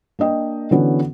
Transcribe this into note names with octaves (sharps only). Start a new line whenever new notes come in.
A#3 D4 D#5 G5
D3 E3 B3 C#4 F#4